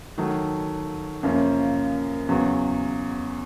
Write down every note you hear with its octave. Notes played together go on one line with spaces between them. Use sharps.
D#3 F#3 A3
F#2 C#3 F3 A#3 C#4
E2 C#3 F#3